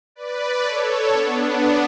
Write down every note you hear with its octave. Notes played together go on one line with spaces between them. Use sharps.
B4 D5
A4 C#5
B3 D4